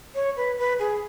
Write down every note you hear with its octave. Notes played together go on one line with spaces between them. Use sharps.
C#5
B4
B4
G#4